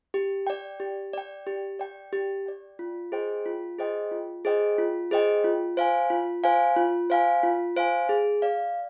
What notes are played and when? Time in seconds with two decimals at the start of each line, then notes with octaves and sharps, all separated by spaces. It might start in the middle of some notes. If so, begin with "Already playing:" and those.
0.14 G4
0.47 D5 G5
0.80 G4
1.13 D5 G5
1.47 G4
1.79 D5 G5
2.13 G4
2.46 D5 G5
2.79 F4
3.12 G#4 C5 D#5 G5
3.46 F4
3.79 G#4 C5 D#5 G5
4.11 F4
4.45 G#4 C5 D#5 G5
4.78 F4
5.11 G#4 C5 D#5 G5
5.44 F4
5.77 C5 F5 G#5
6.10 F4
6.44 C5 F5 G#5
6.76 F4
7.10 C5 F5 G#5
7.43 F4
7.76 C5 F5 G#5
8.09 G#4
8.42 D5 F5